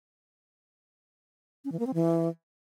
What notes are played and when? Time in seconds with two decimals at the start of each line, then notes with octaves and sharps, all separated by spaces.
1.65 C#4
1.72 E3
1.79 A#3
1.87 C4
1.94 E3